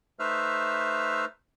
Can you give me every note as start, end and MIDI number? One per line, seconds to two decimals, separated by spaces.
0.19 1.25 57
0.19 1.25 63
0.19 1.25 71
0.19 1.25 72
0.19 1.25 76
0.19 1.25 89